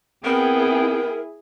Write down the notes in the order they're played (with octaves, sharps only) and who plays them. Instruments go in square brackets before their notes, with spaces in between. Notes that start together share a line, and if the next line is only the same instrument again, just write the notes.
[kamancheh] B3 G5 [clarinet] C4 [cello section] E4 G#4 [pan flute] A#4